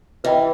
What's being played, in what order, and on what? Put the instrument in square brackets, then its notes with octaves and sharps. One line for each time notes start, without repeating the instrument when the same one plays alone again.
[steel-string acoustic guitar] E3 [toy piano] B4 D#5 G5 B5